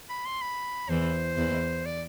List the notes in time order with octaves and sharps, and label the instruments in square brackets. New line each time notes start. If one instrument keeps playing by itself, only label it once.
[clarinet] B5
C6
B5
[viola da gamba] E2 E3 [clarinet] C5
[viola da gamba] E2 E3
[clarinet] D5